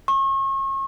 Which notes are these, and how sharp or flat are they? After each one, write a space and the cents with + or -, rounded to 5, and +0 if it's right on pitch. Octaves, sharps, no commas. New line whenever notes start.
C#6 -35